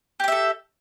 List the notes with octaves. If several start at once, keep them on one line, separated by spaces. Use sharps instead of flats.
G4 A4 E5 G5